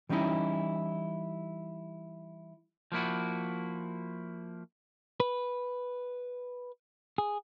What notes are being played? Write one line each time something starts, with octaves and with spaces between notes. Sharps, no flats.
E3 G3 C#4 D#4 E4
F3 A#3 E4 F#4
B4
G#4